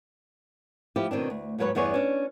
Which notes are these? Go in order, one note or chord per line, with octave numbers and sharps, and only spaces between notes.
F3 E4 G4
B2 D#3 C4 D4
D2
D#2 G#2 F#3 B4 C#5
E2 G2 B3 G#4 C#5 D5
C#4 D4